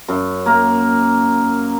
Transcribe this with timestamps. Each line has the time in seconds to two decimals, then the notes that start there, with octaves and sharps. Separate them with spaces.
0.08 F#2
0.46 A#3